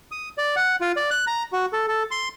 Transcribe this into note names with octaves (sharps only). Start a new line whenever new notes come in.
D#6
D5
F#5
F4
D5
F#6
A#5
F#4
A4
A4
C6